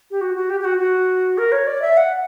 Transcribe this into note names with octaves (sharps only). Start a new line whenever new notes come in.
G4
F#4
F#4
G4
G4
F#4
F#4
A#4
C#5
D5
E5
F#5